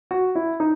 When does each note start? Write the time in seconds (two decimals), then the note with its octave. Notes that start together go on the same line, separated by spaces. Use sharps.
0.11 F#4
0.35 E4
0.60 D#4